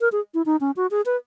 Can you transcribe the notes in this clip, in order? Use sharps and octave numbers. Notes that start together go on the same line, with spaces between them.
A#4
G#4
E4
D#4
C#4
F#4
G#4
B4